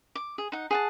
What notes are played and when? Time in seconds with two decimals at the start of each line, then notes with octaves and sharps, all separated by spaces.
0.15 D6
0.38 G#4
0.52 D#4 F#5
0.71 G#4 F#5 A5